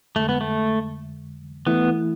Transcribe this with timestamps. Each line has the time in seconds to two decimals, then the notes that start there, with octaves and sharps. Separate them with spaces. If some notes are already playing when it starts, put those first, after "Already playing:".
0.16 F2 D3 G#3 A3
0.29 B3
0.41 A3
1.67 E3 A3 B3 E4